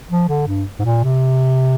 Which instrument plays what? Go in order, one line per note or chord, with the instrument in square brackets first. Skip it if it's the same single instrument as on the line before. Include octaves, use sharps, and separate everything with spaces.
[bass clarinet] F3
D3
G2
G#2
A#2
C3